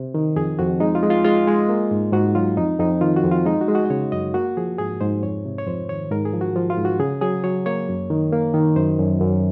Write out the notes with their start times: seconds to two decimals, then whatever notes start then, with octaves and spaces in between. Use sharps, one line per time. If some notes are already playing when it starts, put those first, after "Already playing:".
Already playing: C3 C5
0.14 D#3
0.36 F2 G#4
0.59 F2 F#4
0.80 G#3 D#4
0.95 F4
1.03 G#3
1.10 F4
1.25 G#3 F4
1.47 G#3
1.69 A#3
1.91 G#2
2.13 G#2 F#4
2.35 F#3 F4
2.57 F2 D#4
2.79 F2 D#4
3.01 D#3 F4
3.16 F#4
3.24 F2
3.31 F4
3.45 G#3 D#4
3.61 F#4
3.68 G#3
3.75 F#4
3.85 D#5
3.90 C#3 C#5
4.12 F#2 D#5
4.34 A#3 F#4
4.57 F3 G#4
4.78 G#2 G#4
5.01 G#2 C5
5.23 F2 C#5
5.45 C3
5.58 C#5
5.67 F2 C5
5.89 D#3 C#5
6.11 G#2 A#4
6.25 G#4
6.33 F3
6.41 F#4
6.55 F3 F4
6.70 F4
6.77 G#2
6.85 F#4
7.00 C#3 G#4
7.21 F#3 G#4
7.44 F#3 C#5
7.66 A#3 C#5
7.89 F#2
8.10 D#3
8.32 A#3
8.54 D#3
8.76 F#2 C5
8.99 F#2
9.21 F#2